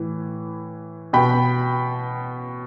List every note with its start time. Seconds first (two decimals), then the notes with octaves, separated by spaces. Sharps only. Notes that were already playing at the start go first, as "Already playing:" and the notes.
Already playing: A2 E3
1.13 B2 G5 B5